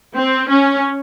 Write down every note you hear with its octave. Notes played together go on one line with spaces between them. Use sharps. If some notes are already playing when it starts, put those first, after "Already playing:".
C4
C#4